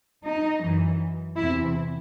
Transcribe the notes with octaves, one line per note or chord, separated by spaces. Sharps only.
D#4
F#2 E3
E2 C3 E3 E4